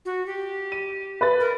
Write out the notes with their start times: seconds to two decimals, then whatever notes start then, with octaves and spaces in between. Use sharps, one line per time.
0.05 F#4
0.26 G4
0.72 D#7
1.21 B4 B5 A6
1.40 A#4